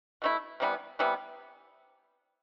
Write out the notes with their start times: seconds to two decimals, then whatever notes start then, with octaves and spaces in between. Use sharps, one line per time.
0.22 B2 A3 E4
0.60 C3 E3 G3 B3
0.99 C3 E3 G3 B3